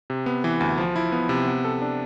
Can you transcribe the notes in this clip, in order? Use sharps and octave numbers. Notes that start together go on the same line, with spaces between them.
C3
B3
E3
D2
F3
E4
B3
C3
B3
A4
D4